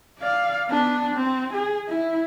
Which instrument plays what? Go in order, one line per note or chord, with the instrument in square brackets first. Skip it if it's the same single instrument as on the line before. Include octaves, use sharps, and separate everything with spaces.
[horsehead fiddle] D5 F5
B3 D4
C4
G#4
E4